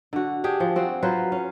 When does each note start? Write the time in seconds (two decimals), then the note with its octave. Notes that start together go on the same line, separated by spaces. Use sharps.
0.13 D3 F#4
0.44 D4 G4 G#4
0.60 F3
0.76 C4 F#4
1.02 F#3 F4 B4 C5
1.32 C#4 F5